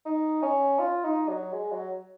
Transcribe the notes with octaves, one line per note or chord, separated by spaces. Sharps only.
D#4
C#4
F4
D#4
F#3
G#3
F#3